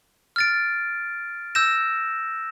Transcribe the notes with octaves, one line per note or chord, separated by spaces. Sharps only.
F6 A6 D7
E6 G6 A#6 E7